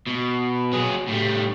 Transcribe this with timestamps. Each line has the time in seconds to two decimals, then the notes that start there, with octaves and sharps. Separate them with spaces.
0.07 B2
0.73 F#3 G#4
1.08 A2 G3